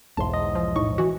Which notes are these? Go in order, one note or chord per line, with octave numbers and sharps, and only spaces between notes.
B1 E2 G#2 A5 C6
D#5
F3
A2 D#4 C#6
E3 F#4